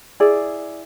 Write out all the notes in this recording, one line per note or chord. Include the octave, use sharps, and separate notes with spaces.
E4 G#4 D5